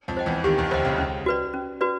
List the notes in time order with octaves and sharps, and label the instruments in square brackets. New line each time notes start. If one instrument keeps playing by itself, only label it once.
[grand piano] F2 F3
[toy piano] C5 D#5 G5
[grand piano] E2 E3
[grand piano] D#2 D#3 [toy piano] G4
[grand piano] D#2 D#3
[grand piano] D2 D3 [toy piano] C5 D#5 G5
[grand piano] C#2 C#3
[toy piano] C#4
F#4 B4 D5
C#4
F#4 B4 D5